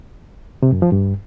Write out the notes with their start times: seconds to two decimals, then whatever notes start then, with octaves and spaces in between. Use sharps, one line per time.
0.62 C3
0.72 F#2
0.82 F3
0.92 G2